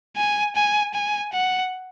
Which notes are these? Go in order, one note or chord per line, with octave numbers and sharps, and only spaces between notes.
G#5
G#5
G#5
F#5